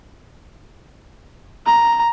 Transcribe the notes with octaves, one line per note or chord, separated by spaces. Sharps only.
A#5